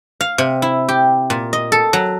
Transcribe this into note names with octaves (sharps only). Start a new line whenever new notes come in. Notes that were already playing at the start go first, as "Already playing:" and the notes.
F5
C3
E4
G4
A#2
D#5
A4
F#3